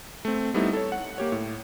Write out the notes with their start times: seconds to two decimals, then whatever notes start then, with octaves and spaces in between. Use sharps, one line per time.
0.25 A3 C4
0.54 G3 A3 B3 C4 D#4 E4
0.73 A4 C#5
0.92 F#5
1.18 A#3 G4 C#5
1.32 A2